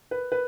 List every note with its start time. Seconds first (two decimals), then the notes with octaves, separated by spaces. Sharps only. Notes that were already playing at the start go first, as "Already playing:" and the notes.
0.11 B4
0.32 B4